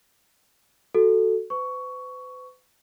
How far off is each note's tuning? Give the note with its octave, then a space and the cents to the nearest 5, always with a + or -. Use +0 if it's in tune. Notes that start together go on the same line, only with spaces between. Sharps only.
F#4 +0 A4 +0
B4 +45 C#6 +10